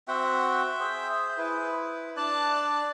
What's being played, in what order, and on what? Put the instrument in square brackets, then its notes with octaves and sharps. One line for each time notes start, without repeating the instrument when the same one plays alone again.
[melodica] C4 F#4 F#5 [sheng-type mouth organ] E5 G5
[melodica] G#4 C5
[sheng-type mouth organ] E4 B4
[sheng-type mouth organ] D4 A5 F#6 [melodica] D5